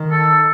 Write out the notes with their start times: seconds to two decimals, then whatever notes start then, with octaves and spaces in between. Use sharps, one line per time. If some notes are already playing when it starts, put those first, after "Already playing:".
Already playing: D#3
0.11 A4